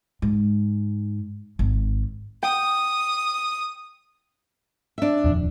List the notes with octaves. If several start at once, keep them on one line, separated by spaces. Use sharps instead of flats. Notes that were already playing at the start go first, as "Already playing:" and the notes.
G#2
G#1
G5 D#6
D4 E5
D#1 F2